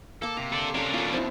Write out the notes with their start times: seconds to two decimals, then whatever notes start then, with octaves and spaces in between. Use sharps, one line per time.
0.22 A#3 A4 D6
0.37 C3 A#5
0.52 A4 D5
0.74 C#4 D4 A4 A#4
0.94 D#2 B2 F4 A4
1.13 C4 E4